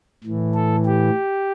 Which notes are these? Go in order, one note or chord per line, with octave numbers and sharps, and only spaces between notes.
A2 E3
A4
G4